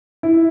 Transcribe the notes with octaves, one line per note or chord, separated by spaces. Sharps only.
E4